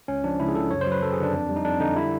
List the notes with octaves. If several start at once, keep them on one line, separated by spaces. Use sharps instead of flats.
C#2 C#4
F3 D4
C#2 E4
G#4
C#3 A4
F#2 C#5
C5
F#3
B4
F#2 A4
G#4
D3
D4
F2
G3
D#4
F2 D4
D3 D#4
G3 E4